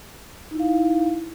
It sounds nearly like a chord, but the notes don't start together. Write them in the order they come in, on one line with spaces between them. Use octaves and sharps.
D#4 E4 F5